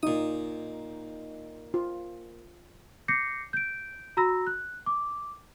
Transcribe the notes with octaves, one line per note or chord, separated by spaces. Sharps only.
A#2 D#4 D#6
F4
D6 G6 A#6 C7 C#7
G6 D7
F#4 A#5 B5 E6 A#6
F#6
D6